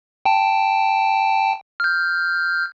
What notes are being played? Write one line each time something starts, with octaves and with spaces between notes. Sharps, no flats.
G5 A5
F6 G6